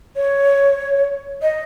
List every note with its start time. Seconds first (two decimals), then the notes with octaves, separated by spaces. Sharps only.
0.16 C#5
1.42 D#5